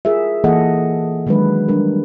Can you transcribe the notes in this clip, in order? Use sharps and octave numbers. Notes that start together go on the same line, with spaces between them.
F4 G#4 A#4 E5
E3 A#3 G#4 A4 D#5 F#5
D#3 F#3 G#3 D4 B4
G3 D4 A#4